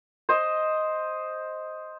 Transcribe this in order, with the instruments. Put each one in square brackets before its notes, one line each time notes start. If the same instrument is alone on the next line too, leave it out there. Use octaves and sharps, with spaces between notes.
[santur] C5 D#5